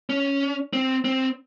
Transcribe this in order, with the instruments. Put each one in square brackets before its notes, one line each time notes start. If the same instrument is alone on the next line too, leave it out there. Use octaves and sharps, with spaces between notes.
[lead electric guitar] C#4
C4
C4